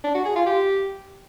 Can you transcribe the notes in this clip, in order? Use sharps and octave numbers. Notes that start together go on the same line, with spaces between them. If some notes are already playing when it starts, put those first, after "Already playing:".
D4
F#4
G#4
F4
G4